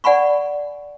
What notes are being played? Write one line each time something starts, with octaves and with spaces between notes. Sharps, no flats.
D5 F#5 G#5 B5 C#6